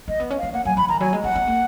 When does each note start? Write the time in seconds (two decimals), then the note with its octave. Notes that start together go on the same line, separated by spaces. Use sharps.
0.08 A#3 D#5
0.20 B3
0.30 C#4
0.38 B3 F5
0.54 A#3 F#5
0.65 F#3 G#5
0.77 F3 B5
0.88 D#3 A#5
1.00 F#3 G#5
1.13 G#3
1.24 B3 F#5
1.35 B3
1.47 A#3